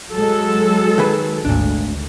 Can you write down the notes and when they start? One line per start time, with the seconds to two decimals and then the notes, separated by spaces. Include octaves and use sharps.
0.13 F#3 G#3 A4
0.98 D#3 G#4 B4
1.45 G#1 D2 A#2 D4